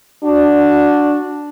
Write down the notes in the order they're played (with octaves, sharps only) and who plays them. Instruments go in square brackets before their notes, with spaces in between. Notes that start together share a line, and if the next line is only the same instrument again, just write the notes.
[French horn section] D4 F#4